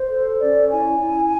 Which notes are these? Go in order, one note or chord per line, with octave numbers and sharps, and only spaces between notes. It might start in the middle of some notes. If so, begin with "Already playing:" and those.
Already playing: C5
A4
C#4 D5
E4 G#5
E4